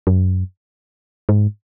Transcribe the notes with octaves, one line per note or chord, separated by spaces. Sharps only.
F#2
G#2